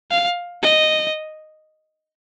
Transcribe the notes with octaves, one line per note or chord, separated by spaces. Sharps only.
F5
D#5